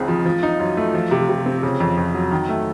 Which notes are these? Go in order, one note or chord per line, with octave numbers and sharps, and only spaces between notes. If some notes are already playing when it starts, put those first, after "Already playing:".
Already playing: C#2 C#3 C4 D#4
F3
F3
D#4
F#2
A3
F3
C3
C3
C4
C#3
F2
F2
F#3
D#3
A3